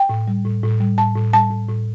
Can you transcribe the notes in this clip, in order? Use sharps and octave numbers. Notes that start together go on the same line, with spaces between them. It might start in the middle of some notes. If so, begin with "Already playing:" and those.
Already playing: G5
A2
G3
A2
A2
G3
A2 A5
A2
G3 A5
A2
A2